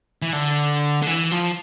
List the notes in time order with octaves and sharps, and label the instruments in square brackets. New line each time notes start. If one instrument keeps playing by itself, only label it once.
[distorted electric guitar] E3
D3
D3
E3
F3